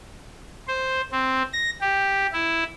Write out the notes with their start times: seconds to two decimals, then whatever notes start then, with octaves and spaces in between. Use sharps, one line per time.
0.68 C5
1.12 C4
1.53 A#6
1.81 G4
2.32 E4